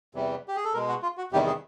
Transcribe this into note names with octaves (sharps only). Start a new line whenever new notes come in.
E2 C3 E3 G3
G4
G#4
A4
B2 G#3 A#4
F#4
F4
F#4
E2 C3 D#3 G3 G4
G#4